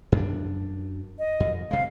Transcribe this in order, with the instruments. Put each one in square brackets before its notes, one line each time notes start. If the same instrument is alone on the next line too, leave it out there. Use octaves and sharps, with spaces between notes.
[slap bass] F#2 D4
[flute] D#5
[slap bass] F2
[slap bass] C3 G#3 [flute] F5